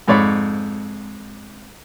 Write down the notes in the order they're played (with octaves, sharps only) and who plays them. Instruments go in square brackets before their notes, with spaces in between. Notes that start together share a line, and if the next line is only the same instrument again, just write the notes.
[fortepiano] F2 G#2 C#5 D5 B5